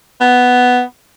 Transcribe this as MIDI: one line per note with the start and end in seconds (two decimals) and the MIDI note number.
0.21 0.81 59